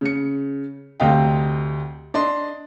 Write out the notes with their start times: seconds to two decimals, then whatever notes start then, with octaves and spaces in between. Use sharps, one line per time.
0.01 C#3 C#7
1.00 D2 C3 C4 D#5 F5 G5
2.14 D4 D#5 C6